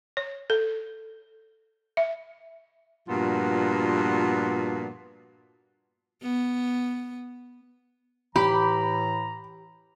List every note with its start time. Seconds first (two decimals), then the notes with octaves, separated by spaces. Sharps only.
0.17 C#5
0.50 A4
1.97 E5
3.08 G2 A#2 F3 B3 F4 F#4
6.22 B3
8.36 A2 E3 G4 A#5 B5